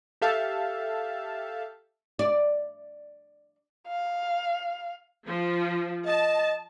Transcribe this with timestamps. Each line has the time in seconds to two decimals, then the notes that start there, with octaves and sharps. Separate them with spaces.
0.22 G4 A4 E5 F5 A5
2.19 D5
3.88 F5
5.25 F3
6.06 D#5 A5